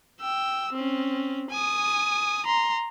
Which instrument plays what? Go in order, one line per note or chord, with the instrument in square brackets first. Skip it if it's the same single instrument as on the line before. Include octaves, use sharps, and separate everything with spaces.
[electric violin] G5 E6
C4 C#4
G#5 D#6
A#5 C6